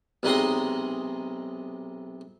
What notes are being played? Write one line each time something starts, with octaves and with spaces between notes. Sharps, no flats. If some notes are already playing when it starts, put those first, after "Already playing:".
B1 C3 G#3 D#4 D#5 C6